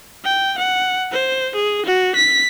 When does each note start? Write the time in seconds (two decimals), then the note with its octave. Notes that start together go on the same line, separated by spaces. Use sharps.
0.25 G5
0.58 F#5
1.12 C5
1.55 G#4
1.86 F#4
2.16 B6